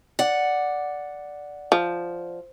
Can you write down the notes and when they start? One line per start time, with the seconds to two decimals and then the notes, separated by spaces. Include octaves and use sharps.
0.19 D5 F#5
1.72 F3